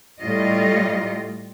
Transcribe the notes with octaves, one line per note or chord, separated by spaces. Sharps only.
A2 G3 F4 D#5